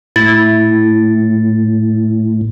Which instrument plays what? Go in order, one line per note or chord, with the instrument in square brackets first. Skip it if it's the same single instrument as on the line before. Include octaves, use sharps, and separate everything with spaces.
[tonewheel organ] A2 [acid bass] E4 [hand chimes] A6